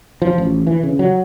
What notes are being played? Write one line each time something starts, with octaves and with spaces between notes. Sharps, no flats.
F3
A1
E3
C#3
F#3